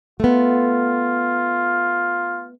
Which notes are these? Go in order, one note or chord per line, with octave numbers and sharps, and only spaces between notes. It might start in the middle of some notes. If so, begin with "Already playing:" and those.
A3 B3 F4